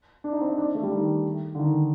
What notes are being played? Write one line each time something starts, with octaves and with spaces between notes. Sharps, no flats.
D4
D#4
C4
D#4
D4
A3
G3
D#3
D3
D#3